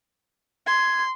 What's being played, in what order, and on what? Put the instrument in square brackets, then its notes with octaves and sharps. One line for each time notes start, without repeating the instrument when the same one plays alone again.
[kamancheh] C6 [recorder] G#6